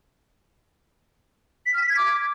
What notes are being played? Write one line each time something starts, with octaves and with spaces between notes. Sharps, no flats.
B6
F6
B6
G#6
D6